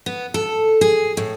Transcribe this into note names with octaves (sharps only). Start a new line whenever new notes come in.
B3
A4
G#4
A2